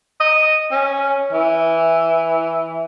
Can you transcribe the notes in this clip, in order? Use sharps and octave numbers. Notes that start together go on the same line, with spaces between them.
D#5
C#4
E3